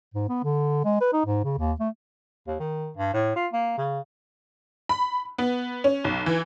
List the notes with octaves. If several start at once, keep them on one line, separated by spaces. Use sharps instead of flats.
G#2
B3
D3
G#3
B4
D#4
G#2
C#3
D#2
A3
D#2
D#3
G2
A2
F4
A#3
C#3
B5
B3
C#4
B1
E3